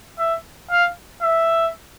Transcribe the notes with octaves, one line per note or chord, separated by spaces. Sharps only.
E5
F5
E5